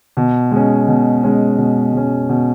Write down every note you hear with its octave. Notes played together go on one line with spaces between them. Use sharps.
B2
G#3 C#4
B2
G#3 C#4
B2
G#3 C#4
B2